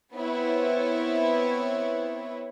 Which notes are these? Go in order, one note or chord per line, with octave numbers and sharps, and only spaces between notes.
B3 C4 E4 C#5